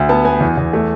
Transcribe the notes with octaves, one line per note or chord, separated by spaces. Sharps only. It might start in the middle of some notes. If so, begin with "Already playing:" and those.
Already playing: D2
B3 A5
B3 G#5
E2
E2
A3